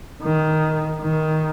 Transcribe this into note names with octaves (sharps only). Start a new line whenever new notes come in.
D#3
D#3